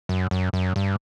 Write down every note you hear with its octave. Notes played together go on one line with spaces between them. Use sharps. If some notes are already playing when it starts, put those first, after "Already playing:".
F#2
F#2
F#2
G2